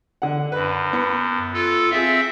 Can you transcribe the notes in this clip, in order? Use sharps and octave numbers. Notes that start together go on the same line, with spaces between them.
D3 F#5
F#2 B4
B3
F4 A4
C4 F4 G#4 E5